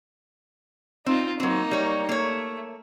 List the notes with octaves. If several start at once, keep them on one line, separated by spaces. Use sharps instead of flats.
C4 D#4 F4
F#3 A#3 C4 D#4
G3 C#5
A3 A#3 C#5